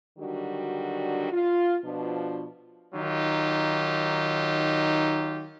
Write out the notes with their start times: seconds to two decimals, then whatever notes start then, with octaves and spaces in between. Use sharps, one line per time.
0.19 D3 D#3 F#3 G3 D4 F#4
1.32 F4
1.84 B2 F3 D4
2.94 D#3 F#3 D#4 F4 G4